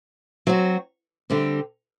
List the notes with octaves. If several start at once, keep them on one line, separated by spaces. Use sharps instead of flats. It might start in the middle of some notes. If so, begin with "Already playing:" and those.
F#3 C4 F#4
D3 G3 C4 G4